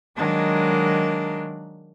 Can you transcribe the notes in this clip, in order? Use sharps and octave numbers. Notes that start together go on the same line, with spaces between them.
D#3 F#3 G#3 A#3 D4